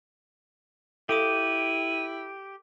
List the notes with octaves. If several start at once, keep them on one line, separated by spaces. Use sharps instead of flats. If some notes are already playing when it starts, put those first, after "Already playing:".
E4 G4 A4 F5 D#6 D#7